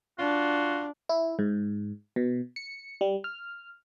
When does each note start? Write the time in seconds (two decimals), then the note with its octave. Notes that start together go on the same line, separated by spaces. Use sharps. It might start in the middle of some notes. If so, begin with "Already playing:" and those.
0.19 D4 F4 F#4
1.09 E4
1.39 G#2
2.16 B2
2.56 C#7
3.01 G3
3.24 F6